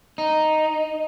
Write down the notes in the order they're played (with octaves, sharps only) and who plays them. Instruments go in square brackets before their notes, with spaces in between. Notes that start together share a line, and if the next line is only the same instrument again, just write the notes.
[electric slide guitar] D#4